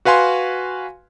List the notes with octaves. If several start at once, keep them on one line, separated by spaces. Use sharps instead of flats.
F#4 B4 F5 G#5 C6